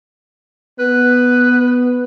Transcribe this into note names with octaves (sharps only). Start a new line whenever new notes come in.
B3 B4